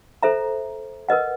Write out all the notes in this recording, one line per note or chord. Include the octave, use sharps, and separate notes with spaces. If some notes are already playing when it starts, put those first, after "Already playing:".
A4 C5 E5 A#5
A#4 B4 D#5 F#5